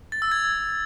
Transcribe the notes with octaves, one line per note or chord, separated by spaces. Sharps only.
A6
E6
G#6